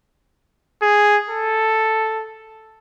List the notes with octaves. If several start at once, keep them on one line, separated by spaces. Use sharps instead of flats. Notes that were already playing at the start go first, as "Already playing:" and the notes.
G#4
A4